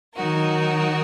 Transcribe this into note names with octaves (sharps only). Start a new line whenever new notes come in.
D#3 F#3 D#4 F#4 A#4